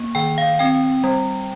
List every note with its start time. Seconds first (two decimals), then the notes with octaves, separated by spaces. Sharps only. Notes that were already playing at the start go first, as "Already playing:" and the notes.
Already playing: A#3
0.15 D#3 G5
0.38 F5
0.59 C4 G5
1.04 G3